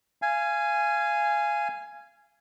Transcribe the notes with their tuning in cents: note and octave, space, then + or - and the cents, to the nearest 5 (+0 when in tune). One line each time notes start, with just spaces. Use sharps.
F5 -25 G#5 +0